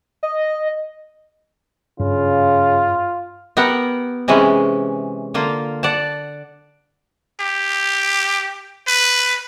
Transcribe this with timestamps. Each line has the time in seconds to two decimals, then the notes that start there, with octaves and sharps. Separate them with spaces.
0.23 D#5
2.00 G2 C#3 F4
3.57 B3 G4 A#4 F#5
4.28 C3 E3 G#3 C#4
5.34 D3 A#3 F4
5.83 D5 F#5 A5
7.40 G4
8.88 B4